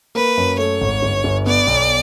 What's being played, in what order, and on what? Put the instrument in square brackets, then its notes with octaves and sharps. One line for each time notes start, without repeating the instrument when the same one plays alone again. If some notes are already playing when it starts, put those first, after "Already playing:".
[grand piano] A#3 [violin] B4
[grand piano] F#2
[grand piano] A3 [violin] C#5
[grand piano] G#1
G1
G1
[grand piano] B3 [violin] D5
[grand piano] B1